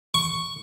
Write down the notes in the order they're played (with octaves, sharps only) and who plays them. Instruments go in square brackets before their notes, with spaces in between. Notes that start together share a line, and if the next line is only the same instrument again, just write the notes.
[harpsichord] C#6